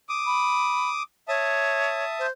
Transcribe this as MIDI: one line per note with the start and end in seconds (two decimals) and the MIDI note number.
0.09 1.03 86
0.09 1.03 87
0.26 0.90 83
1.28 2.04 73
1.28 2.27 76
1.28 2.27 81
1.28 2.27 87
2.19 2.30 72